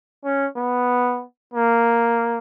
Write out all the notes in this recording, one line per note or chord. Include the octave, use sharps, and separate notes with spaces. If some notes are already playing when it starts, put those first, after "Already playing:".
C#4
B3
A#3